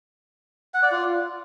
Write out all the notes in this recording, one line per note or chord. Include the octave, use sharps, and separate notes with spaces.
F#5
D5
F4